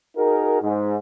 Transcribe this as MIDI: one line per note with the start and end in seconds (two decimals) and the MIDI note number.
0.17 0.57 63
0.17 0.57 66
0.17 0.57 68
0.17 0.57 70
0.61 0.97 44